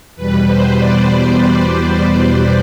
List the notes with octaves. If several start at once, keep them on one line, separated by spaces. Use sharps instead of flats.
E2 B2 G3 B4
C5
D5
B4
C5
C5
C5